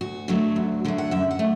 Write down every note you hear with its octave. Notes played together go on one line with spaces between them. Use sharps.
D2 F#4
D3 F#3 A3
D2
D3 F#3 A3
F#5
F#2 E5
F#5
A3